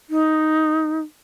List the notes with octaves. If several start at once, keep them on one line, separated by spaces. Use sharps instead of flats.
D#4